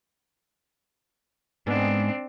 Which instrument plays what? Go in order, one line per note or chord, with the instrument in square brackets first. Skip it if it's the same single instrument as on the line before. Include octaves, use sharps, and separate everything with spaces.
[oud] G#2 B3 [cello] C4 D4